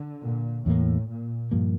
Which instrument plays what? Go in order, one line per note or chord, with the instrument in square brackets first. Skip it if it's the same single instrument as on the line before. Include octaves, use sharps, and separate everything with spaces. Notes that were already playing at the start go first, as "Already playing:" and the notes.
Already playing: [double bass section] D3
A#2
[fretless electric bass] E2 E3 G3 A#3 [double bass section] A2
[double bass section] A#2
[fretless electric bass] G2 F3 A#3